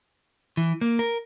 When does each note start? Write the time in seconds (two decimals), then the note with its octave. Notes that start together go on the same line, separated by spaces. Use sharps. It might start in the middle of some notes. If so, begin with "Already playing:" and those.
0.57 E3
0.81 A#3
0.99 A#4